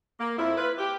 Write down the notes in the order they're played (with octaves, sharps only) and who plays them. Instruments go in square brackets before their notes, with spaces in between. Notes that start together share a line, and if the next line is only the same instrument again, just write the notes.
[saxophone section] A#3
F2 E4
F4 B4
G4